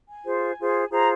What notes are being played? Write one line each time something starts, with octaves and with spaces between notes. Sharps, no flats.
G#5
F4 G#4 C5
F4 G#4 C5
F4 G#4 C5 A#5